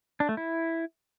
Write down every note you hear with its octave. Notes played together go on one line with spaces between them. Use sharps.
D4
A3
E4